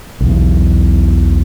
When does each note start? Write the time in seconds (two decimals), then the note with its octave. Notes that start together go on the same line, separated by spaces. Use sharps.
0.20 B1 E2